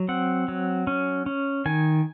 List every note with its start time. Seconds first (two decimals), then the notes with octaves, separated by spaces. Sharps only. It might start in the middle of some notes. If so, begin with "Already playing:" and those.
Already playing: F#3
0.08 C4 F#5
0.48 F#3
0.87 C#4
1.26 C#4
1.66 D#3 G#5